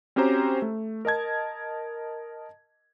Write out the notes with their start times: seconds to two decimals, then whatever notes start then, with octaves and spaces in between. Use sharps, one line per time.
0.16 C4 C#4 F#4 G4 C5 A#5
0.62 A3
1.05 A#4 D#5 A5 G#6